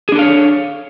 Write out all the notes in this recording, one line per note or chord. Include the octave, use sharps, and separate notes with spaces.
D4 G#4 A4 C#5 F5